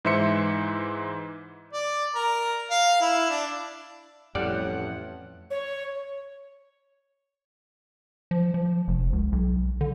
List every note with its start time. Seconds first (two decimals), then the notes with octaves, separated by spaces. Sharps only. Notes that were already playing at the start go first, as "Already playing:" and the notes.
0.05 G#2 E3 C5 E5 C6 C#7
1.73 D5
2.15 A#4
2.70 F5
3.01 E4
3.30 D4
4.35 A1 F2 A2 G3 D5 F#5
5.50 C#5
8.31 F3
8.54 F3
8.88 F1
9.13 C#2
9.32 B1
9.81 D3